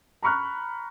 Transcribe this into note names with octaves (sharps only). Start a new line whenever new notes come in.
A#5 B5 C#6 F6 F#6